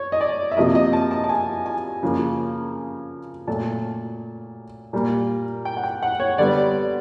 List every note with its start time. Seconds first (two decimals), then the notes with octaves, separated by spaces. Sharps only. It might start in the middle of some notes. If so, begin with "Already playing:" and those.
Already playing: C#5
0.12 D#5
0.21 D5
0.52 E5
0.57 C3 F3 A#3 D#5
0.75 D#5
0.93 A5
1.11 A5
1.24 A5
1.29 G#5
1.66 G#5
2.03 C#3 F3 A#3
3.47 A#2 F#3 A3 A5
4.93 A#2 G3 A#3
5.65 G5
5.77 F#5
5.84 G5
6.03 F#5
6.20 C#5
6.38 D3 G3 B3 D5